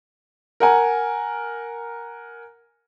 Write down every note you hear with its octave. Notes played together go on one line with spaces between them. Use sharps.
A#4 F#5 G#5